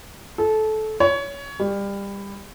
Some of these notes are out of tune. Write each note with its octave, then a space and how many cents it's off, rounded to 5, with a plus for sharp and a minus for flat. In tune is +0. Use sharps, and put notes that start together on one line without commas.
A4 -20
C#5 +20
G3 +25